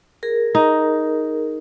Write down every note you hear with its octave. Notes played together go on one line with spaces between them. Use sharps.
G#4 A#4
D#4